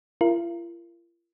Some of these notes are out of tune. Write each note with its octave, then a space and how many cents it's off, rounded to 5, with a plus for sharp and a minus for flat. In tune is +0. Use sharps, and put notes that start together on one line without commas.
F4 -45 A#4 +0